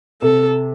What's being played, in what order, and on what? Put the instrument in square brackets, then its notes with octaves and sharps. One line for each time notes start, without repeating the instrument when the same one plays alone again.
[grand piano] C3 [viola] A4